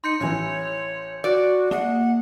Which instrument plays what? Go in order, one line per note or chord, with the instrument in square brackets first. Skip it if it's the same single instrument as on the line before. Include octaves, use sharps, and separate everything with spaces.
[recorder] D#4 [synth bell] C6 G6 C#7
[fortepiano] A1 E3 [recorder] C#5
[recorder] F#4 [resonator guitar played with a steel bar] D5
[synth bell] A#3 [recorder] F#5